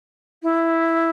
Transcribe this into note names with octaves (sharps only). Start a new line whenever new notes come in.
E4